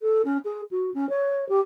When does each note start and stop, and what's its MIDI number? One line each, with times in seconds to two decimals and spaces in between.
0.02 0.22 69
0.25 0.38 61
0.45 0.62 68
0.71 0.90 66
0.94 1.09 61
1.09 1.48 73
1.49 1.60 67